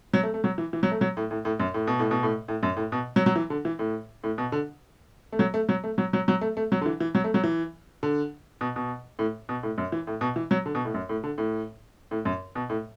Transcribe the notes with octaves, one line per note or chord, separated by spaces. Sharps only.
F#3
A3
A3
F#3
E3
E3
F#3
A3
F#3
A2
A2
A2
F#2
A2
B2
A2
B2
A2
A2
F#2
A2
B2
F#3
F#3
E3
D3
E3
A2
A2
B2
D3
A3
F#3
A3
F#3
A3
F#3
F#3
F#3
A3
A3
F#3
D3
E3
E3
F#3
A3
F#3
E3
D3
B2
B2
A2
B2
A2
F#2
E3
A2
B2
E3
F#3
D3
B2
A2
F#2
A2
D3
A2
A2
F#2
B2
A2